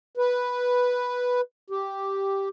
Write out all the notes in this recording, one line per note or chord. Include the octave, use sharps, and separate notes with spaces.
B4
G4